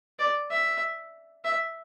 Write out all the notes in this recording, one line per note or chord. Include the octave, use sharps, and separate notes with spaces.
D5
E5
E5